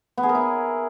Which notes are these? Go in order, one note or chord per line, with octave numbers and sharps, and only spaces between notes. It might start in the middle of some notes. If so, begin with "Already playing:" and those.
B3
G#4
A#4
E4